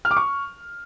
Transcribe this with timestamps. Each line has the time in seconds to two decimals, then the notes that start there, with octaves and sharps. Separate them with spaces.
0.05 F6
0.11 D6
0.17 C#6